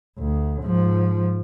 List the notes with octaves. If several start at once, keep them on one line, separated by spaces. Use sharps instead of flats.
D2
G#2 F3